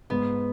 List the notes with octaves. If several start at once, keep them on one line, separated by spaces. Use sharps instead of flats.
G#2 B3